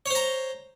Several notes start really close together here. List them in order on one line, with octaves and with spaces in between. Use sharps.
C#5 C5 A#5